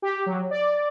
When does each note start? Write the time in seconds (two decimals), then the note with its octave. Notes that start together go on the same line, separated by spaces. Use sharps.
0.02 G4
0.26 F#3
0.51 D5